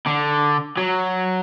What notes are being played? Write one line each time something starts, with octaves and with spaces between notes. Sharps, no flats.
D3
F#3